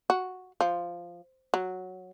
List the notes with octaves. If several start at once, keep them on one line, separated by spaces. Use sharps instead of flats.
F#4
F3
F#3